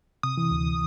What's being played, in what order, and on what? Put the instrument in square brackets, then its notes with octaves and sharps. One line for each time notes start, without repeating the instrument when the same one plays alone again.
[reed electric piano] C3 [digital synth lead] D#6
[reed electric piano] E3
D2